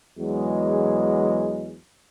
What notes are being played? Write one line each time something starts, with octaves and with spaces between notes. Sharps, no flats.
E2 F#3 G#3